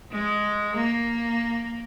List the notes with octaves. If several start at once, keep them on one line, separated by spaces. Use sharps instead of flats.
G#3
A#3